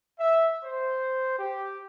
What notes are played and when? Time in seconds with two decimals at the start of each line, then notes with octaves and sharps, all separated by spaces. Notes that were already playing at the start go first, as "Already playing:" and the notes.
0.19 E5
0.63 C5
1.39 G4